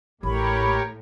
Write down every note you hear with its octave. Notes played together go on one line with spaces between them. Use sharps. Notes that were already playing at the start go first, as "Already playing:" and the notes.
A1 A2 G4 A#4 C#5 B5